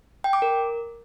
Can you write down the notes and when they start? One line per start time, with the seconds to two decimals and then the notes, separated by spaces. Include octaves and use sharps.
0.24 G5
0.33 D6
0.42 A#4